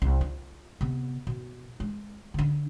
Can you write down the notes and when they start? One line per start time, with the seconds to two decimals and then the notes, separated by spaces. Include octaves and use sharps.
0.02 C2
0.21 F4
0.81 C3 B3
1.27 B2
1.80 G#3
2.34 D3 D4